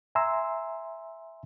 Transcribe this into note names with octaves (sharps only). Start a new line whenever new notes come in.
E5 G#5 A#5 C6 E6